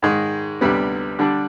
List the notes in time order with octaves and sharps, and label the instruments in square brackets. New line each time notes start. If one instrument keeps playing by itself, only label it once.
[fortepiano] G#2 D#3 G#3
D2 C3 G3 B3
D3 G3 D4